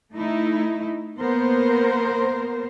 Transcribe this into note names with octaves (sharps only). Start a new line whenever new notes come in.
A3 D#4 E4
A#3 B3 A#4 C5